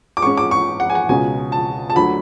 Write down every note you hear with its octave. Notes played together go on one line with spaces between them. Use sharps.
D6
G#2 G#3 C#4 C#6
D6
C#6
F#5
G#5
F#5
C#2 B2 G#3 C#4 G#5
A5
A5
D2 D3 F#3 A3 B5